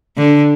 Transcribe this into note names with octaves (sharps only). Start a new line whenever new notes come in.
D3